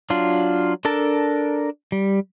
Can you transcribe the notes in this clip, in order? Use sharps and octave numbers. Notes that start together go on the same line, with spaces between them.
F#3 D4 F4
D4 A4 A#4 A5
G3